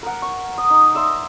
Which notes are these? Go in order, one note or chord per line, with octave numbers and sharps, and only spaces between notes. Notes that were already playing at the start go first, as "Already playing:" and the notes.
A#4 F#5
C#6
D#6
D#4
D5 E5 A#5 C6